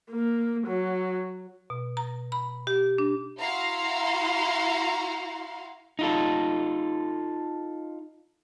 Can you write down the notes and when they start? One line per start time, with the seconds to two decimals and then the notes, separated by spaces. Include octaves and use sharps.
0.11 A#3
0.67 F#3
1.70 B2
1.97 A#5
2.32 B5
2.67 G4
2.98 D4
3.39 E4 F#4 F5 A#5 C6
5.99 D#4 F4 A4